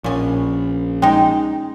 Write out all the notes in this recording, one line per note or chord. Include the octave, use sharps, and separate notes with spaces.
A#1 A#2 B3 C#4
G#3 D#4 G5